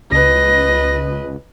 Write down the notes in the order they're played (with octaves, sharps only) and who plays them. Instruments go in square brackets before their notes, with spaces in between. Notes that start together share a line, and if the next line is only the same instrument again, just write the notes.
[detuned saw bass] C#2 [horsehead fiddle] B4 D#5 [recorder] A#6